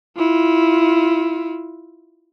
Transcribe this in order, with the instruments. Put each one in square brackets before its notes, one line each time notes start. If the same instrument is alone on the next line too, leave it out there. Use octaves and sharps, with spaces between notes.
[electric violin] E4 F4